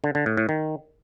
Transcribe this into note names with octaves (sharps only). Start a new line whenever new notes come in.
D3
D3
A2
A2
D#3